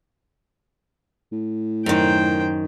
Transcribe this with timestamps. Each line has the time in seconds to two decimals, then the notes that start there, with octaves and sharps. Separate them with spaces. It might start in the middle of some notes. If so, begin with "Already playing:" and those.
1.32 A2
1.86 F#2 D#3 C5 G5